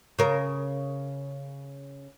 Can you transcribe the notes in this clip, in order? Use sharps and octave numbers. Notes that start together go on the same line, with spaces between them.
C#3 A#4